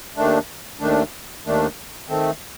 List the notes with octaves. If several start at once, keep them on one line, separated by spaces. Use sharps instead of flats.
D#2 D#3 A3 D4
D#2 D#3 A3 D4
D#2 D#3 A3 D4
D#3 A3 C4